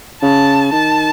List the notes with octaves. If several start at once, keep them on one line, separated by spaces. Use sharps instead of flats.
C#3 A5
D#3 A5